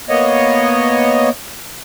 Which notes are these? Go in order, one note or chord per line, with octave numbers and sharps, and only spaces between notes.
A#3 B3 C#5 D#5